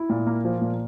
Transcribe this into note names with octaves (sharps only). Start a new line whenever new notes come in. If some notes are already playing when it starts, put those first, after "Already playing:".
Already playing: E4
A#2
A#3
F3
A#2